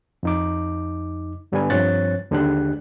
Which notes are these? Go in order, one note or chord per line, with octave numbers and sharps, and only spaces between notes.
F2 D#4 D6
G2 D3 G3 B3 B4 G#5
G2 F3 C4 C#5 F#6 A6
D#2 D3 G#3 D4 G4 F#6